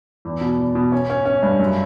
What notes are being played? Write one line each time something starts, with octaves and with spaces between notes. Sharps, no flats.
E2
B2
E2
B2
C#4
C#4
C#4
G2
F#2